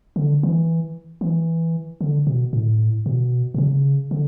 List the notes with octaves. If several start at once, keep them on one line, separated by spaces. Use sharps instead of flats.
D3
E3
E3
D3
B2
A2
B2
B2
C#3
D3